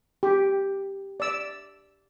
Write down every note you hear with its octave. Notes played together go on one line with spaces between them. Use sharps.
G4
D5 E6